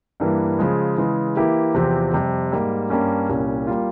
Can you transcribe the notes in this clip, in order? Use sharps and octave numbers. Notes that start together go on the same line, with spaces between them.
G2 E3 G3 A#3 E4
C#3 F3 G#3
C#3 E3 G#3
E3 A#3 E4 G4
E2 C3 F3 C4 G4
F2 C3 G3
G#2 G3 A#3
G2 G3 A#3 C#4
C2 A#2 G3 C#4
G3 A#3 F4